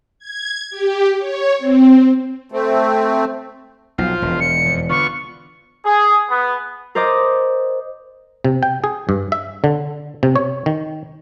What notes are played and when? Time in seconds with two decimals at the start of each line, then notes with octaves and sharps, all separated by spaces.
0.19 G#6
0.71 G4
1.18 C#5
1.59 C4
2.52 A3 C4
3.98 B1 F3 F4 C5
4.22 E1
4.40 C#7
4.66 F2
4.89 D3 B3 F4 C#6
5.84 G#4
6.29 B3
6.95 A#4 C5 D5 D#5 D6 D#6
8.44 C3
8.63 G5
8.84 G#4
9.09 G2
9.32 E5
9.64 D3
10.23 C3
10.36 C#5
10.66 D#3